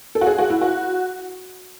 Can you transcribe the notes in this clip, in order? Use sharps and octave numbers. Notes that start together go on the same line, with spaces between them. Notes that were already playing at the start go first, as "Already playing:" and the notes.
A4
F#4
G#4
F#4
E4
F#4